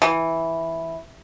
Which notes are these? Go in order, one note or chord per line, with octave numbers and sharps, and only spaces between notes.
E3